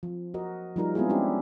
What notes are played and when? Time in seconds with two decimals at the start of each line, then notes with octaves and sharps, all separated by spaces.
0.03 F3
0.34 F#4 A#4 D#5
0.76 F3 G3 D#4 A#4
0.95 G#3 B3 C4 E4 F4 G#4
1.09 G#3 C#4 D4 E4 G4